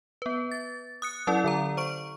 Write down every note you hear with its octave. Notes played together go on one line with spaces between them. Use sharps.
B3 B4
A6
D#6 F#6 C#7
F#3 C#4 E4 A4 D5
D3 A4 A#5
C5 C#6 D7